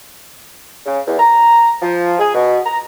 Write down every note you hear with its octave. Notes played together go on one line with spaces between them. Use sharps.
C#3
E2
A#5
F3
G#4
B2
A#5